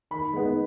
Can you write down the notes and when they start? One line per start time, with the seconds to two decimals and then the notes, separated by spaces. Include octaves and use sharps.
0.11 D#3 B5
0.33 G#3 B3 D#4